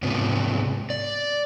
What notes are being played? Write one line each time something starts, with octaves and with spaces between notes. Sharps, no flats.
G#2 C3 B3
D5